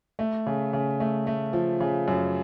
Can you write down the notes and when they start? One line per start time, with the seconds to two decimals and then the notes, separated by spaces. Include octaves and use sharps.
0.19 A3
0.47 C#3
0.73 C#3
1.00 A3
1.27 A3
1.53 F3
1.80 C#3
2.08 F#2